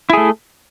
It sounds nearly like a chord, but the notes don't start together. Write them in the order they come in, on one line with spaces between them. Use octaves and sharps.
E4 G#4 A3